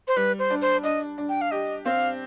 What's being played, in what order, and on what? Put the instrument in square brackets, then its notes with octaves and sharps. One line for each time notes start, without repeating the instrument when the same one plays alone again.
[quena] C5
[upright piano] G3 [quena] B4
[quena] C5
[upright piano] D4
[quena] C5
[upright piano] D4 [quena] D#5
[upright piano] D4
[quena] G5
F5
[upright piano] G4 [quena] D#5
[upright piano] C4 [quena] F5